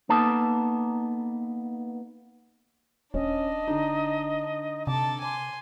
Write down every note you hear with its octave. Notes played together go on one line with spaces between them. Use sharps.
A#3 B3 D#4 A4 A5
D#1 C#4 D4 D#5
D3 D#4
C3 A4 A5 D6
G#5 C6